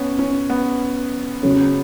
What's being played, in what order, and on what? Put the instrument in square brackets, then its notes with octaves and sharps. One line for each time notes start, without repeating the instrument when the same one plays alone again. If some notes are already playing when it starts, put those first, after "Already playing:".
Already playing: [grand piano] B3 C#4
C#4
B3
[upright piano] C#3 F#3 C#4